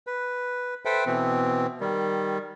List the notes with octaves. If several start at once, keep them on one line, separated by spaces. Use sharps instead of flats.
B4
A4 B4 C5 E5 G5
B2 E3 C4
D#3 G3